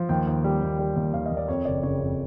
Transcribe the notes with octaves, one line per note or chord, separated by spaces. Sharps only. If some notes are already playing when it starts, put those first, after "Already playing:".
Already playing: F3
D#2 G5
D#2
G3
D#2
G3
D#2
D#2 F5
D#5
D#2
D5
F2 C#5
F#1 D5
C#3 C#5
F2